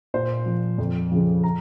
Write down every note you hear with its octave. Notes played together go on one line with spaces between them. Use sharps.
A#2 C5
F3
F2
C#3 F3
A#5